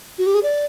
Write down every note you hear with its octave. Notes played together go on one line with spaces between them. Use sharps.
F#4
G4
G#4
D5